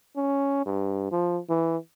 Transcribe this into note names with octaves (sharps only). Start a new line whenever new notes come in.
C#4
G2
F3
E3